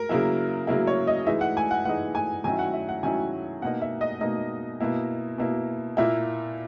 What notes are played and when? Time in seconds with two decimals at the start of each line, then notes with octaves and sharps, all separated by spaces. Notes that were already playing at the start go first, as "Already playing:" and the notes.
Already playing: A#4
0.09 C#3 F#3 A#3 E4
0.67 C#3 F#3 A#3 E4
0.87 C#5
1.07 D#5
1.27 E3 G#3 D#4 E5
1.41 F#5
1.57 G#5
1.71 F#5
1.85 E3 G#3 D#4 F#5
2.15 G#5
2.44 D#3 F#3 C#4 E4 G#5
2.59 F#5
2.74 E5
2.89 F#5
3.03 D#3 F#3 C#4 E4 G#5
3.62 B2 A#3 D#4 F#5
3.81 E5
4.01 D#5
4.21 B2 A#3 D#4 D#5
4.80 B2 A#3 E4
5.38 B2 A#3 E4
5.97 A#2 A#3 E4 E5